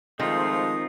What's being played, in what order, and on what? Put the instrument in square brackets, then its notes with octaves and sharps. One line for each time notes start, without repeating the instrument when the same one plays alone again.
[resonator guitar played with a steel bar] D#3 [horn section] F3 G#3 A3 [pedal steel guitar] C4 D#4 F4 [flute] D#6